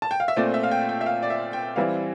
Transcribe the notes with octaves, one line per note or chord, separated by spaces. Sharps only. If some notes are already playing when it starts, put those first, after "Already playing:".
A5
G5
F5
E5
A#2 A3 C4 F4 D5
E5
F5
G5
G5
E5
F5
D5
E5
G5
E3 G3 C4 E4 F5